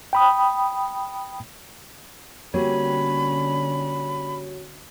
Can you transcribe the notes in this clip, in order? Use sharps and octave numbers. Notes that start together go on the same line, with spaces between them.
G5 B5 D#6
D3 G3 A#3 C4 C#4 F#4 C#5 B5